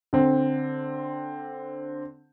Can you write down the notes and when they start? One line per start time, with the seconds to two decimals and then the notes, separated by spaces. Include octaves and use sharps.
0.13 D3 C4